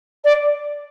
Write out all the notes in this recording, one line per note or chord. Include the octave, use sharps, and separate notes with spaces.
D5